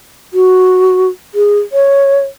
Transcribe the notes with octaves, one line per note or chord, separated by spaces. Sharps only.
F#4
G#4
C#5